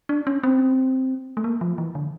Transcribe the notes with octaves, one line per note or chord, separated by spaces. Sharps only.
D4
C#4
C4
A3
A#3
F3
E3
D3